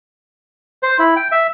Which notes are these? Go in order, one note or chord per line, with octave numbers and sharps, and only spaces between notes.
C5
E4
G5
E5